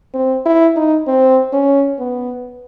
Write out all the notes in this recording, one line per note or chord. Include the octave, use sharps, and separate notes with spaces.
C4
E4
D#4
C4
C#4
B3